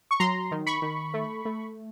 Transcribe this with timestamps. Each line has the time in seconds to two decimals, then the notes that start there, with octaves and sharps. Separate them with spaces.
0.11 C#6
0.20 F#3 A#5 C6
0.51 D#3
0.66 B5 C#6
0.82 D#3
1.14 A3
1.45 A3